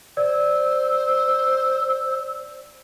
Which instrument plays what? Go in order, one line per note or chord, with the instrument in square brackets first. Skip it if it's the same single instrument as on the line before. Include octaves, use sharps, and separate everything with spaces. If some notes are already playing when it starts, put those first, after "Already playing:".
[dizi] C5 [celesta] D5 [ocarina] E6